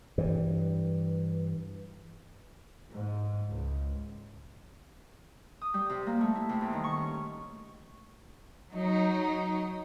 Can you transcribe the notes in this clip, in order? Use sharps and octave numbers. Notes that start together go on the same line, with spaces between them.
G2 E3
G#2
C#2
D#6
G3
C3
A#3
A3
E4
C3
E2
D#3
C#6
C#4
F#3 D#4